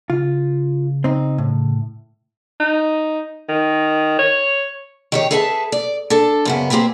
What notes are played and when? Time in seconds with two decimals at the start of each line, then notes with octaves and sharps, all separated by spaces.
0.10 C#3 F4
1.04 C4 D#4
1.38 A2
2.60 D#4
3.49 D#3
4.19 C#5
5.12 D#3 G4 C#5
5.31 G#4 A4 B4 E5 G#5 A5
5.72 D5
6.10 D4 A4
6.45 F#2 C#3 B3
6.70 A#3 C4 G4 G#4 B4